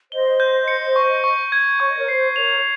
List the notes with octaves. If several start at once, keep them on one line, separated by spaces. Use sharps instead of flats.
C5 D#5 G7
G6
C#7
C#6
C#6
G#6
C#5 C#6
D#5
A#4 C#5
C5 C7
A#4 C#5 F7